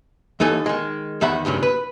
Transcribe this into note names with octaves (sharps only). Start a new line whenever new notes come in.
D#2 E3 D#4 A4 G#5
D#3 G#3
E2 D#3 E5 F#5 B5
D2 G2 C#3 F#3
B4